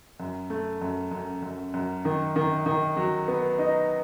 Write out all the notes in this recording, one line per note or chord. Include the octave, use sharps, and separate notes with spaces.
F#2
A3
F#2
F#2
F#2
F#2
D#3
D#3
D#3
F#3
B3
D#4